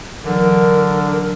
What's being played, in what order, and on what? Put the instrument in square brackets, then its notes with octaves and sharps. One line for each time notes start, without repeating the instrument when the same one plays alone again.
[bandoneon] D3 [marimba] E3 F#3 D4 [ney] A#4